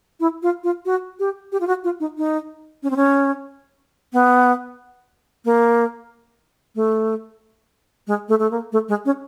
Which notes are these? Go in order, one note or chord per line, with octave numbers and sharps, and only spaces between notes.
E4
F4
F4
F#4
G4
G4
F4
F#4
F4
D#4
D#4
C#4
C4
C#4
B3
A#3
A3
G#3
A3
A3
A#3
A3
G#3
C#4